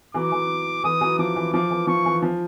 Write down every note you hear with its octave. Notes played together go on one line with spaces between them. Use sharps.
E3 F#3 D6
E3
E3 D#6
E3 F#3
F3 D6
E3
F3 D6
E3
F3 C#6
E3
F3